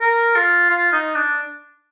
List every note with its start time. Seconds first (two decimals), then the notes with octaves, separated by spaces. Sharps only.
0.01 A#4
0.36 F4
0.70 F4
0.92 D#4
1.14 D4